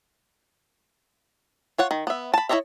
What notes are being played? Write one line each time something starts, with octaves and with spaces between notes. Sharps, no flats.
F4 C#5 F#5
D#3
B3 E5
A5 B5
E4 A#4 C#5 D#5 E5